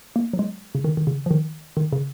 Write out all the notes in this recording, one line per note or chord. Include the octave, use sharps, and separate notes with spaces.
A#3
F#3
G#3
C#3
D#3
D#3
C#3
F3
D#3
D#3
C#3